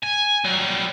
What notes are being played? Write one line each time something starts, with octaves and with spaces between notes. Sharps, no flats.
G#5
F#3 G3